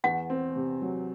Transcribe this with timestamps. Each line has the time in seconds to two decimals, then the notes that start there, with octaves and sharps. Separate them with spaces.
0.04 E2 F#5
0.30 C4
0.56 C3
0.82 F#3